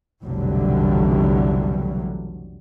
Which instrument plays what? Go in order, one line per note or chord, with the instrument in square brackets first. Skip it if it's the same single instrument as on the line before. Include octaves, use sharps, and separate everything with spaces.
[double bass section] F1 B1 D3 E3 F#3 G3